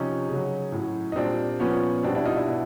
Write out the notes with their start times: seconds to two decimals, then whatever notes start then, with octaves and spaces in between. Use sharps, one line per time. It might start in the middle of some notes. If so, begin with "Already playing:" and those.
Already playing: C3 F3 C#4 D#4
0.29 C#3 F#3
0.72 A2 F#3
1.12 D#4
1.16 A#2 G3 C4 D4
1.60 A#2 F3 B3 C#4
2.03 B2 G3 C4 D4
2.15 D4 E4
2.25 D#4 F4
2.36 D4 E4
2.47 B2